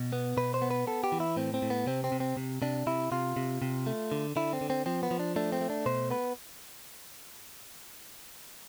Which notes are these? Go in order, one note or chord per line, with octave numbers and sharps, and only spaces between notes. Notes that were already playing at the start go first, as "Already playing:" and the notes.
Already playing: B2
B3
B2 B4
C5
B3
B4
B3 A4
G4
E3
E4
A2 C4
C4
A2
B3
C3 C4
C4
C3
C4
C3
C3 D4
C3 E4
C3 F4
C3
C3
A3
D3
D3 E4
C4
D3
C4
F3 C4
B3
F3
D4
A3 D4
C4
A3
D4
B2 C5
B3 B4